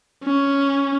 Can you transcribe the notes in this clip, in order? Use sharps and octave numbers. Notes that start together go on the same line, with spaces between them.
C#4